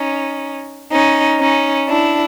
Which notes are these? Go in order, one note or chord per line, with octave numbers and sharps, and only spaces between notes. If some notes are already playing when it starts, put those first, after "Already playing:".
Already playing: C#4 D#4
C#4 D#4
C#4 D#4
D4 E4